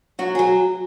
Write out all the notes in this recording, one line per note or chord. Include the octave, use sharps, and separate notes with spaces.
F#3 F#4
F#3 G#4